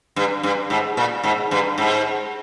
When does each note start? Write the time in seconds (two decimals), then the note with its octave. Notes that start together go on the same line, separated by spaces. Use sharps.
0.16 G2
0.43 G2
0.70 G#2
0.97 A#2
1.24 G#2
1.51 G2
1.78 G#2